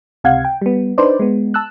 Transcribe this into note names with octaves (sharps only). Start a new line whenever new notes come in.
C#2 C3 F5 F#5 G#6
G5
G3 B3
D4 D#4 B4 C5 D5
G#3 B3
A5 E6 F#6